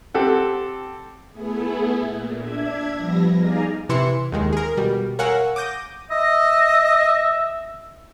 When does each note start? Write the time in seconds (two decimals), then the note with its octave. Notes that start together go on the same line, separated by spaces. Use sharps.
0.14 C4 G4 A4 F#5
1.30 A3 B3 E4 G#4
2.00 A#2
2.38 D4 E5 G#6
2.94 F3 G3 B3 A#6
3.36 D#4 G#4 D5 F5 G#5 A#5
3.89 C3 E3 E4 C6 C#7
4.32 D#2 D#3 G#3
4.53 G#4 A#4
4.77 B2 G3
5.19 A#4 C#5 F5 F#5 G#5 E6
5.56 D6 D#6 G6 A#6 D#7
6.11 D#5 E5